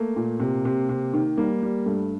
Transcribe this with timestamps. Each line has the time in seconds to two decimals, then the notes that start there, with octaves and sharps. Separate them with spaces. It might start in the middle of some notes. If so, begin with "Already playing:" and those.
Already playing: A3 A#3
0.16 A#2
0.40 C3
0.65 C3
0.89 C3
1.14 D#3
1.38 G3 A#3
1.63 G3
1.86 G2 A3